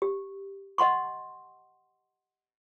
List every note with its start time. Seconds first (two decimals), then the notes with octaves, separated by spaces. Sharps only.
0.02 G4
0.78 D#5 F#5 C6 C#6